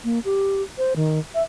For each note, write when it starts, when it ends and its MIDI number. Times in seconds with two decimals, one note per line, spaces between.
0.04 0.19 58
0.25 0.62 67
0.78 0.93 72
0.96 1.19 51
1.35 1.43 76